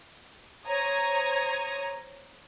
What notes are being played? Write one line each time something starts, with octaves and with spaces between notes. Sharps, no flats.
C5 C#5 A#5 D#6 G#6